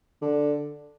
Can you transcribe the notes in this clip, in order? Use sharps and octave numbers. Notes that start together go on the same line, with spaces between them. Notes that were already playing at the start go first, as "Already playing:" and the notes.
D3